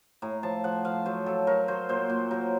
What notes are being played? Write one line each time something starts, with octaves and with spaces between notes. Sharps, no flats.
A2 A#5
F3 A5
F3 F#5
F3 F5
F#3 C5
F#3 A4
F#3 A#4
F#3 C5
A#2 C5
A#2
F#3 A#4